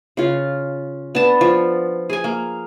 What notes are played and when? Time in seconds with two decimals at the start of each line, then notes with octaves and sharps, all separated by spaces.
0.17 C#3 F4
1.15 B3 D4 A5
1.41 F3
2.10 G#4 G#5
2.24 A#3